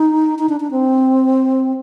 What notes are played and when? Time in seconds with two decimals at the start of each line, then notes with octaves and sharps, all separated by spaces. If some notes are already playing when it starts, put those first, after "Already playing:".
Already playing: D#4
0.39 D#4
0.49 D4
0.60 D4
0.71 C4